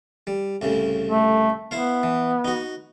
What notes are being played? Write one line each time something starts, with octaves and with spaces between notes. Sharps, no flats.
G3
C2 A2 C#3
A3
B3 E4 C5 F5
E3
D#4 F#4